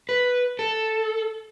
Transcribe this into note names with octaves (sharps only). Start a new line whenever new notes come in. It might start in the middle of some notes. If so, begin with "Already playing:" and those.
B4
A4